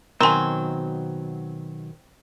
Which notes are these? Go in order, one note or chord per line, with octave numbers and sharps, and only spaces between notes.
B2 D#3 F#3 C4 A#4 G#5 A#5 C6